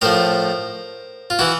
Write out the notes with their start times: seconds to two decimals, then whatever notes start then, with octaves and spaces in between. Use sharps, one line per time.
0.01 A2 F3 A#4 C5
1.30 F4
1.39 E3 E4 F#4